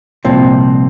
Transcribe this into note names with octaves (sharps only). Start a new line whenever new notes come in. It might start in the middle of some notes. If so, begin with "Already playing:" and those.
C2 A#2 F3 C4